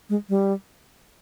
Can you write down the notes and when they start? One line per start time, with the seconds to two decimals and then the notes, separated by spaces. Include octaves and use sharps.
0.10 G#3
0.29 G3